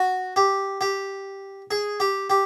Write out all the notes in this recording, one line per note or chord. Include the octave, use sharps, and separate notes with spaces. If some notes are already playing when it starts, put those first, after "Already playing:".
Already playing: F#4
G4
G4
G#4
G4
G4